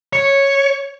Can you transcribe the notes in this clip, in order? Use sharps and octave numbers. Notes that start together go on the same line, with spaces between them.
C#5